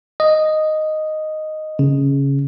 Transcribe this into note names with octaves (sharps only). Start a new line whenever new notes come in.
D#5
C#3